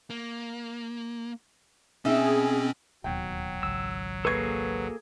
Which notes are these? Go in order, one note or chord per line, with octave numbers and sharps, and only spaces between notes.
A#3
B2 C4 C#4 D#4 G#4 E5
D1 D#2 B2 F#3 G5
G#1 C#2 E6
A#3 G#4 A4 B4 C#6 G#6